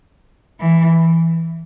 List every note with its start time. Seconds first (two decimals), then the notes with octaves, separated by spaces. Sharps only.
0.61 E3